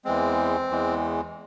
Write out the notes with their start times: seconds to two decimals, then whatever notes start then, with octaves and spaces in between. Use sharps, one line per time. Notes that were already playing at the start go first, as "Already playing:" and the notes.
0.05 E2 E3 G#3 C4
0.70 E2 E3 G#3